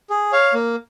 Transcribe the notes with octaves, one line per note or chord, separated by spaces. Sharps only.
G#4
C#5 F5
A#3